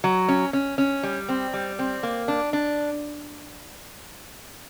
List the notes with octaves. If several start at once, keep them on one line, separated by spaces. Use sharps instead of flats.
F#3
C#4
C#4
C#4
G3
C4
G3
C4
A#3
D4
D4